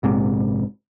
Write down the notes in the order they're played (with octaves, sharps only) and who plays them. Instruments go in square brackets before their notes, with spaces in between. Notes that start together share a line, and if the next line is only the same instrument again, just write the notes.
[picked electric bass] A#1 G#2 C3